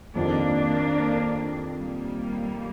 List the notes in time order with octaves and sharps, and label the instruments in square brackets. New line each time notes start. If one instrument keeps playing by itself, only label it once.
[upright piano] F2 C3 D#3 [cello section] A#3 D4
[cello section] G3 A#3